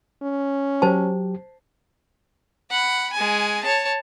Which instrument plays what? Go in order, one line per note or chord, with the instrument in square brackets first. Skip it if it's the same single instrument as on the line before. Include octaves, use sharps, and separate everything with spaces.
[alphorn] C#4
[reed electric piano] F#3 G4 [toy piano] C5 A5
[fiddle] F#5 B5
G#3 G#5
C#5 A5